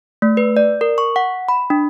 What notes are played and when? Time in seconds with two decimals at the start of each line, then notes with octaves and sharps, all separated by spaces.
0.22 A3
0.37 B4
0.57 D5
0.81 A#4
0.98 C#6
1.16 F#5
1.49 B5
1.70 D4